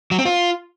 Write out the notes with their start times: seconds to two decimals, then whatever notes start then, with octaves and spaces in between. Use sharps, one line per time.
0.11 F#3
0.18 C4
0.26 F4